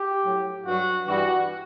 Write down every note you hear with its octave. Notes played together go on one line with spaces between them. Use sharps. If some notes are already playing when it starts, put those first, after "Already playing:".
Already playing: G4
A2 F#3
G2 F#3 F#4
G2 E3 G3 F#4